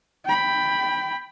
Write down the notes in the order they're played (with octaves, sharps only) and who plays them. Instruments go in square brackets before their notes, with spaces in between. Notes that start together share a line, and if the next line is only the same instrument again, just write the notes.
[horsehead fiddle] G5 B5